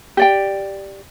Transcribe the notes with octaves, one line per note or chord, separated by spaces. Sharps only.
G4 D5 G5